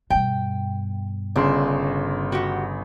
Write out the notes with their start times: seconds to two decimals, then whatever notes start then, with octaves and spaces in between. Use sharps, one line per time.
0.10 G2 B2 G5
1.36 G1 C#3 D4 C6
2.32 F#4 G4 F#5